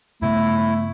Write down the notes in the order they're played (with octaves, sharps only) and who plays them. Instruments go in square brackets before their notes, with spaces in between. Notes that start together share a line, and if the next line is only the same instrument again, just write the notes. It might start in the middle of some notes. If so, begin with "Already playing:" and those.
[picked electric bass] G2 C#3 B3 [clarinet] A3 [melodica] E4